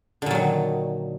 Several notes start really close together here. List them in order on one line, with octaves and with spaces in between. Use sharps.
D3 A#2 F#3 D#3